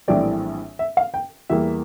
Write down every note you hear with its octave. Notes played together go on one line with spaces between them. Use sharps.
A#1 A2 E3 G3 C4 D5
E5
F5
G5
E2 E3 G3 A#3 E5